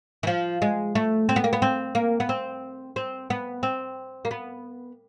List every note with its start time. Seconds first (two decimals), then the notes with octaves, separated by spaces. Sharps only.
0.23 E3
0.27 F3
0.62 G#3
0.95 A3
1.29 C4
1.36 B3
1.44 A#3
1.53 B3
1.62 C4
1.95 A#3
2.20 B3
2.29 C4
2.96 C4
3.30 B3
3.63 C4
4.25 A#3
4.31 B3